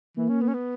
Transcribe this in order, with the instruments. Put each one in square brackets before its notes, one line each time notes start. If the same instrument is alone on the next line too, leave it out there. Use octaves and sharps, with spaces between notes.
[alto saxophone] E3 [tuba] A#3
[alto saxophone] C#4
B3
C#4
B3